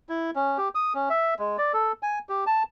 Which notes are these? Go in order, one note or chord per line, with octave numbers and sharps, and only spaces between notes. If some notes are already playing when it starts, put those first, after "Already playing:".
E4
C#4
G4
D#6
C#4
E5
G#3
D5
A4
G#5
G4
A5